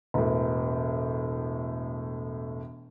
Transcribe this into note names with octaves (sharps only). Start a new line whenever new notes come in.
E1 A2